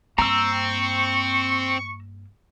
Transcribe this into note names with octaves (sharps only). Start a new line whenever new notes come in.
G2 A#3 C4 A#5 C#6 E6